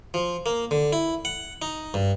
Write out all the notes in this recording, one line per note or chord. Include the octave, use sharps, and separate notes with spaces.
F3
A#3
D3
E4
F#5
D#4
G2